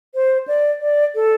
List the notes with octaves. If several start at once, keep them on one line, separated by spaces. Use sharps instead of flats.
C5
D5
D5
A4